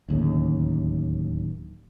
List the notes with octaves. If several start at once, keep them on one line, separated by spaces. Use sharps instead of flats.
D1 D#2 C#3